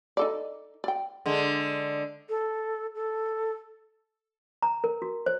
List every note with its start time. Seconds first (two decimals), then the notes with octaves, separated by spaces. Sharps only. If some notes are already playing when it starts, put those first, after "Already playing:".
0.17 D#4 A4 D5
0.84 D5 G5
1.26 D3 G#3
2.29 A4
2.95 A4
4.62 A#5
4.84 A#4
5.02 F#4
5.26 C5